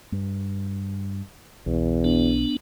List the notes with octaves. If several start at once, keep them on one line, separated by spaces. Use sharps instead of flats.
G2
B1 E2
B3 D4